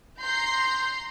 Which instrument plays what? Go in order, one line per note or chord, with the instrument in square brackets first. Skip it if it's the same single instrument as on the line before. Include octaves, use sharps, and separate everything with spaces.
[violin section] A#5 C6 G6